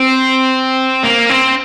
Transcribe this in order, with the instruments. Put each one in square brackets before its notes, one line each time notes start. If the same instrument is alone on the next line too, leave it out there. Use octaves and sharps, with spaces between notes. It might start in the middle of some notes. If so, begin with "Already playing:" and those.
Already playing: [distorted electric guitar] C4
A#3
C4